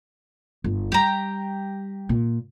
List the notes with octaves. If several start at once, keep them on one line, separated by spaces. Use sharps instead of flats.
G1
G3 G4 A#5
A#2